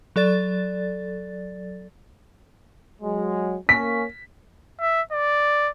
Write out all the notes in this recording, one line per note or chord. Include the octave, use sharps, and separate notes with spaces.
F#3 A4 D5 A6
F#3 G#3
A#3 C#4 B6
E5
D5